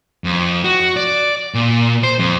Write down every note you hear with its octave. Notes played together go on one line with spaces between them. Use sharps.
F2
F#4
D5
A#2
C5
F2